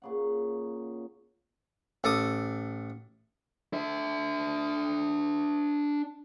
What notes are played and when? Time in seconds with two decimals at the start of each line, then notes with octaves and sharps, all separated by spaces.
0.02 A#2 C#3 F#5
2.04 A1 A4 D6 D#6
3.73 D4 E5